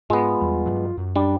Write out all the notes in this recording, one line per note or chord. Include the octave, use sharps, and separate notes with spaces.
G#2 G#3 B3 F4
E2 G3
G2 F#3
F#2
G3 D4